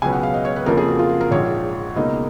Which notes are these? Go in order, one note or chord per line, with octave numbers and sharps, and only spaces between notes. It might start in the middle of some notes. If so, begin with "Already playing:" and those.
C#2 B2 F#3 B3 G#5
F#5
F5
D#5
C#5
B4
F2 C#3 F3 A#3 A#4
G#4
F#4
F4
F#4
A#4
A#1 G#2 F3 C#5
C#2 B2 A#3 D#4 D#5